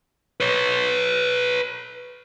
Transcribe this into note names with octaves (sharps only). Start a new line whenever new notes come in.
B4 C#5